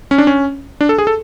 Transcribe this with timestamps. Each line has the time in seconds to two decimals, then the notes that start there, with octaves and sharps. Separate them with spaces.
0.11 C#4
0.18 D4
0.27 C#4
0.81 D4
0.89 A4
0.98 G#4
1.07 A4